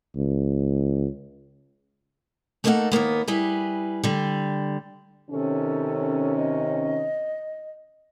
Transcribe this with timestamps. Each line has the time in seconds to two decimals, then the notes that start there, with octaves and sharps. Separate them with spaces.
0.16 C#2
2.64 A3 A#3 D#4 A4 E5 F#5
2.92 D#2 A#2 A#3 B3
3.28 G3 E4 G#4 B4
4.04 D3 G3
5.31 C3 D#3 C#4 A4
6.37 D#5